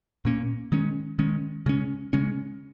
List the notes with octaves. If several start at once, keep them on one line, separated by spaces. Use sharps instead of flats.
A#2 A#3 C#4
D#3 G#3 C#4
D#3 G#3 C#4
C#3 G#3 C#4
C#3 G#3 C#4